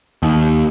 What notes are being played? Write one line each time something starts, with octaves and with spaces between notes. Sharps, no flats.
D#2